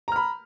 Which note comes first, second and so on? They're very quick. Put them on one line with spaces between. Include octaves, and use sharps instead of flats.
A#5 F6 B5